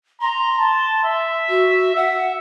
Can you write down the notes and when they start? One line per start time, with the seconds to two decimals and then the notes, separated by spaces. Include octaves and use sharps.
0.21 A#5 C6
0.59 A5
1.05 E5
1.49 F#4
1.96 E5 F#5